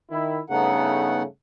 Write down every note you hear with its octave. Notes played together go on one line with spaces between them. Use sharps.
D#3 E4
G2 C#3 A3 B3 D#4 F#5